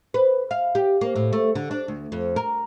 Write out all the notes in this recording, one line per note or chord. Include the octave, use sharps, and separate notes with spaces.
B4
F5
G4
A#3
A2
A3
D3
D4
D2
F2
A#4